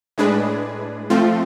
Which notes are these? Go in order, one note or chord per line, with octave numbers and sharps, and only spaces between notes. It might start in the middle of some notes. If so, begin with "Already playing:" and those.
A2 G#3 D4 G#4 B4
F3 A3 C4 F4